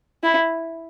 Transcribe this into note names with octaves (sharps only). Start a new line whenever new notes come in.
E4